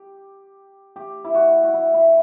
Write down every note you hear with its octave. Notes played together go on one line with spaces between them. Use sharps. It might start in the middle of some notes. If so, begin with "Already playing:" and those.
Already playing: G4
G4
E4
F#4
F#4
E4
E4